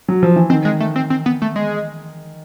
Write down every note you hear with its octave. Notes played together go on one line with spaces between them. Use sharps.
F#3
F3
E3
D#3 C4
G#3
A3
C4
C4
B3
A3
G#3